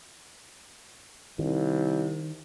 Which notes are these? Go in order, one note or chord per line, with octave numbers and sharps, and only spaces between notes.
C2 D#3